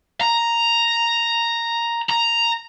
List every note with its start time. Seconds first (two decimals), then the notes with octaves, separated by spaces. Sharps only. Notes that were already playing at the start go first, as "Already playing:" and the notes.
0.21 A#5
2.09 A#5